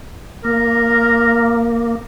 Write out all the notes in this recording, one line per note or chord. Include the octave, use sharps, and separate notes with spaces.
A#3 A#4